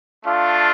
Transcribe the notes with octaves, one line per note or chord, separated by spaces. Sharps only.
A3 D4 F4 A4